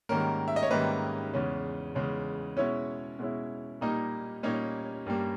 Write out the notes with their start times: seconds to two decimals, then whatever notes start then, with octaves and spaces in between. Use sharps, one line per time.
0.09 G#2 D#3 G3 A#3 C#4 A#4
0.48 E5
0.56 D#5
0.63 C#5
0.70 G#2 D#3 G3 A#3 C#4 B4
1.34 E2 C#3 G#3 C#4
1.95 E2 C#3 G#3 C#4
2.57 B2 G#3 C#4 E4 C#5
3.19 B2 G#3 C#4 E4
3.81 A#2 G3 A#3 D#4 D#5
4.43 A#2 G3 A#3 C#4 D#4 C#5
5.06 G2 G3 A#3